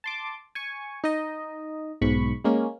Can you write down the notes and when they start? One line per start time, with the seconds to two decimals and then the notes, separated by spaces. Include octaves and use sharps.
0.04 A5 C6 D6
0.55 G#5 C#6
1.04 D#4 D#5
2.01 B1 G#2 B5 C#6
2.44 G#3 A#3 C#4